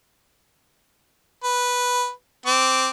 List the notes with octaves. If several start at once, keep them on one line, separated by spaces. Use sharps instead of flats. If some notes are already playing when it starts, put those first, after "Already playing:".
B4
C4 D6